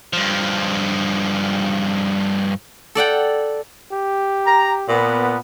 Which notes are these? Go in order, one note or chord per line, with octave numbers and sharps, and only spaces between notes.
G2 F3
A4 D5 F#5 G5
G4
A#5
A#2 B3